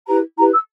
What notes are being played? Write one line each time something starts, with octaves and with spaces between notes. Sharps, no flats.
E4 G4 B4 A#5
E4 G4 B4 A#5
E6